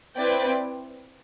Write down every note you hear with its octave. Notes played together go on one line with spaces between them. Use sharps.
C4 E4 B4 D5 G5